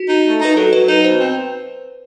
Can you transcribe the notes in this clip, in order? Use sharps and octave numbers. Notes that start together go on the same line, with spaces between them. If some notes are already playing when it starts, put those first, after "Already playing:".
Already playing: F#4
D#4
A3
D#4 B4
F#3 A4
F#3 B4
D#4 B4
B2 C5
C4